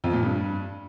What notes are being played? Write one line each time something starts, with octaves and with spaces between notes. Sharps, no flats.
F2
A#2
G2